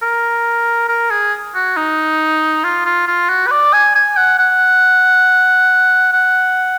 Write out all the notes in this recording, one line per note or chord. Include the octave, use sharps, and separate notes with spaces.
A#4
A#4
G#4
F#4
D#4
F4
F4
F4
F#4
B4
D5
G#5
G#5
F#5
F#5
F#5